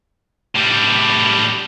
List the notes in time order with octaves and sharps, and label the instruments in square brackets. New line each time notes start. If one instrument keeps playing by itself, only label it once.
[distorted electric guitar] A2 G3